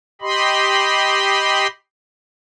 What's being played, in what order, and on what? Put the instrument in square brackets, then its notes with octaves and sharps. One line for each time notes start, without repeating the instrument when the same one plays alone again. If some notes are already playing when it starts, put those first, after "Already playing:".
[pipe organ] G4 D#5 B5 C6